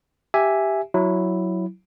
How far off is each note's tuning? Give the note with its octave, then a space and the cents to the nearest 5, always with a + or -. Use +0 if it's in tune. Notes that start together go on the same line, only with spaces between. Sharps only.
G4 +0 E5 +0 G#5 +0
F#3 +0 E4 +0